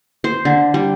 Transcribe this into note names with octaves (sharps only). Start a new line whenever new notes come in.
C5
D3
G3